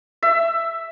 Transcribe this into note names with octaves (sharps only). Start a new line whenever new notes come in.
E5